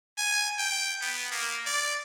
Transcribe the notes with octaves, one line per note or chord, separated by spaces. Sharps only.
G#5
G5
B3
A#3
D5